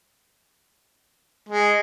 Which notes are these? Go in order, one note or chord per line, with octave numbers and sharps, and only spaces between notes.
G#3